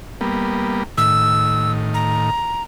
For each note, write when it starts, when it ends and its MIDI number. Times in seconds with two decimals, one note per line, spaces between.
0.21 0.83 55
0.21 0.83 58
0.21 0.83 59
0.98 2.30 45
0.98 2.30 51
0.98 1.72 88
1.94 2.63 82